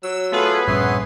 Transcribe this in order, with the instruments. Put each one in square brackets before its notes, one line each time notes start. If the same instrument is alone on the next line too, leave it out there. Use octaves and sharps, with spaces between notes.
[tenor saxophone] F#3 [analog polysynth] E6
[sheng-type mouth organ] A3 F4 A4 [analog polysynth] B3 G#4 B4
[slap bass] A#1 G2 C#4 [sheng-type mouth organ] C#5 C6 [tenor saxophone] E5